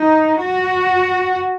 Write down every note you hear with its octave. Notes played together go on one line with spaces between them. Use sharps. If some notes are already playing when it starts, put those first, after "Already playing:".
Already playing: D#4
F#4